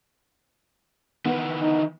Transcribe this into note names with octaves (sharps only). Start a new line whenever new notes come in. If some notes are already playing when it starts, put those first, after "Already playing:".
D#3 E3 B3
D#4